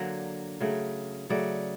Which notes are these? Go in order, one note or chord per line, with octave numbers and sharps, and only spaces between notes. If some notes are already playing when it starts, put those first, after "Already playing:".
Already playing: D3 F#3 A#3
C#3 F#3 A3
C#3 F#3 A3 D5